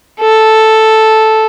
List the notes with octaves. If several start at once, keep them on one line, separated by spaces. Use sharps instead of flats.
A4